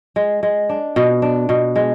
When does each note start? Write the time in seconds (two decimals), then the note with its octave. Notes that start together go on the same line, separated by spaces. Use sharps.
0.16 G#3
0.43 G#3
0.69 D4
0.96 B2
1.22 D4
1.49 B2
1.76 G#3